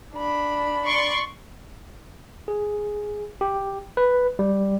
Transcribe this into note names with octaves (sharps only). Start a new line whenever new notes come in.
D4 B5
D5 C6 C#6
G#4
G4
B4
G3